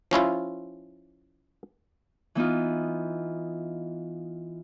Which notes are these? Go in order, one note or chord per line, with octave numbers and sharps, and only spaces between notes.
F3 C#4 E4 F4
E3 B3 D#4 F4